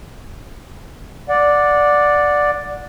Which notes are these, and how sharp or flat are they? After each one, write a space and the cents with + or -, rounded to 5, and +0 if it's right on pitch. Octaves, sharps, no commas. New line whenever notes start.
D5 +0 F#5 -20